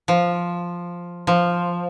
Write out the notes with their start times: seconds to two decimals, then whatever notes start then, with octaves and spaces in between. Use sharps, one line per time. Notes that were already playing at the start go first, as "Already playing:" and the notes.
0.08 F3
1.27 F3